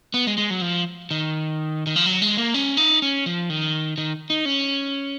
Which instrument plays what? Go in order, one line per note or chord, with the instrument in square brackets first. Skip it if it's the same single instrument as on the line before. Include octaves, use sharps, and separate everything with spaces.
[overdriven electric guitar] B3
G#3
G#3
F#3
F3
D#3
D#3
F3
F#3
G#3
A#3
C#4
D#4
C#4
F3
D#3
D#3
D#4
C#4